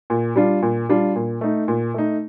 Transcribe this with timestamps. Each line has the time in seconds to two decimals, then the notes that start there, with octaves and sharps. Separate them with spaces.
0.10 A#2
0.36 G3 D4 F4
0.62 A#2
0.89 G3 D4 F4
1.16 A#2
1.41 A3 D#4
1.68 A#2
1.94 A3 D#4